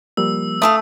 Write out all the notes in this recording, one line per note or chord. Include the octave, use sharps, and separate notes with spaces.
F3 G3 A#3 E6
A3 F5 A5 D#6